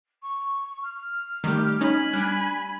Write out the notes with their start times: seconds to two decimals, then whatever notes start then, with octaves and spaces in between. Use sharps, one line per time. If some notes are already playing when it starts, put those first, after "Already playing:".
0.23 C#6
0.83 F6
1.44 D#3 G3 A3 G4
1.81 C#4 D#4 G#5 B5
2.14 G3 D4 F#6